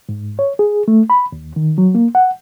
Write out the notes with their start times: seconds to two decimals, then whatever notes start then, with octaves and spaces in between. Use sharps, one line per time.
0.09 G#2
0.39 C#5
0.59 G#4
0.88 A3
1.10 B5
1.32 D#2
1.56 D#3
1.78 F#3
1.95 A#3
2.15 F#5